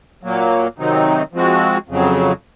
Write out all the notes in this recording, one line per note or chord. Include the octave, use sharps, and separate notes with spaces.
A#2 F#3 A#3
C3 D#3 F#3 C4 D#4
F3 G#3 C4 F#4
F2 C#3 F#3